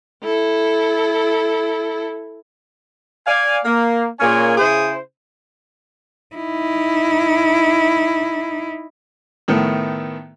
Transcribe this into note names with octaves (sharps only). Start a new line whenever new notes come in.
E4 A4
D5 F5 G#5
A#3
A#2 A#3 C#4 G#4 C#5 G#5
C#3 E4 G#4 C5
D#4 E4
A2 D#3 A3 B3